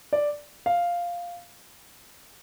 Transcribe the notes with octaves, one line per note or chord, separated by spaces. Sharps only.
D5
F5